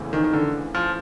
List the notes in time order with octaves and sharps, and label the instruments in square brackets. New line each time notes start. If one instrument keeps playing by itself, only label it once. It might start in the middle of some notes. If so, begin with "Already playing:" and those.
Already playing: [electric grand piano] E2 C#3 E3 A3 C4
[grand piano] D#3
D#3
D3
F3